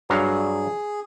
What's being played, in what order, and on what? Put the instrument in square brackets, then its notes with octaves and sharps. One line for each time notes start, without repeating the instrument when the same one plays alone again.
[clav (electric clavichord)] G2 F#3 F5 [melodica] G#4